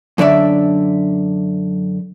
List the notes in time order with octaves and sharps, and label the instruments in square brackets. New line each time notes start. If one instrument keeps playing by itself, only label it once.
[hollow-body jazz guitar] F#2 D3 D4 D5 E5